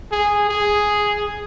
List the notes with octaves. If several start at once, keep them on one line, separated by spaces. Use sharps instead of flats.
G#4
G#4